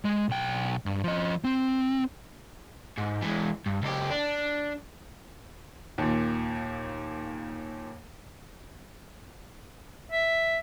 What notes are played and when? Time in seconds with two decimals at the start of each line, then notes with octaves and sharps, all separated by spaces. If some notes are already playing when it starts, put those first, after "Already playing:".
0.05 G#3
0.29 B1 G5
0.86 G2
1.04 F3 D#5
1.44 C4
2.98 G#2
3.22 E3 G#3
3.66 G2
3.82 C#2 G4
4.10 D4
5.98 D#2 A#2
10.11 E5